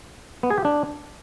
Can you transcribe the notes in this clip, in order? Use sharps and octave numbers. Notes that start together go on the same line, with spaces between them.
B3
G#4
G4
D4